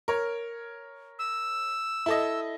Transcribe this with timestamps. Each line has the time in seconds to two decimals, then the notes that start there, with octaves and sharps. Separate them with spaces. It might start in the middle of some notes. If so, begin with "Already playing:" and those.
0.08 A#4 C#5
1.19 E6
2.06 E4 A4 D#5